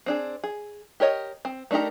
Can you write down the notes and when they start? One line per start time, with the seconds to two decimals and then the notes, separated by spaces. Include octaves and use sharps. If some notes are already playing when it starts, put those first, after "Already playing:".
0.06 C4 D4 G#4
0.44 G#4
1.00 G4 A#4 C#5 D#5
1.45 C4
1.71 A3 D4 D#4 G4 A#4